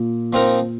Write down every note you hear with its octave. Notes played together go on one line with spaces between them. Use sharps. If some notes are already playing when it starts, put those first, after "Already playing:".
Already playing: A#2
F3 C4 D#4 A#4